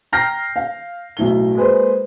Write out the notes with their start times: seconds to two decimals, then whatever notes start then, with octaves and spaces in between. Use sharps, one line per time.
0.12 G5 A#5 F6 G6 A#6 C7
0.56 F5
1.17 B1 A2 G7
1.55 G#3 A#3 G#4 B4 C5